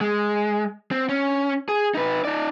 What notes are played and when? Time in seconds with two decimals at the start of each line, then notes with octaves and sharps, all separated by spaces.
0.01 G#3
0.91 C4
1.09 C#4
1.68 G#4
1.95 D#4 B4
2.25 D#4 D5